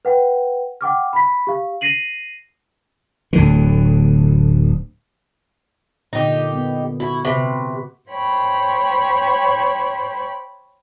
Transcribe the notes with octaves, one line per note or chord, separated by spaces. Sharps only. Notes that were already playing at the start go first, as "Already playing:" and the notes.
B4 F#5 G5
F#5 G5 D6 F6
B5 B6
G4 F5
A#6 C7 D#7 F#7
D1 D2 D3
A#2 D3 D#4 G4
B3
E4 F#4
C3 B4
C5 C#5 G5 B5